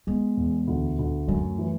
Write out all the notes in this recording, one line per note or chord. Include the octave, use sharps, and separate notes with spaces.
G#3 B3
E2
D2
D2
F#2 A3
E3